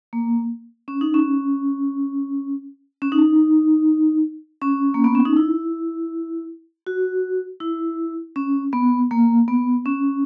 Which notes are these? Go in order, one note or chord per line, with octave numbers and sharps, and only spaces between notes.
A#3
C#4
D#4
C#4
C#4
D#4
C#4
A#3
B3
C#4
D#4
E4
F#4
E4
C#4
B3
A#3
B3
C#4